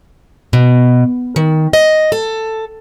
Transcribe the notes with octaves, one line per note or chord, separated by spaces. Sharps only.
B2
D#3
D#5
A4